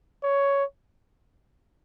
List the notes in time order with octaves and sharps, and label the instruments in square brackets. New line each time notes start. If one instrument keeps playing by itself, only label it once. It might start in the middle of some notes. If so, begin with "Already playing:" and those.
[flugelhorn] C#5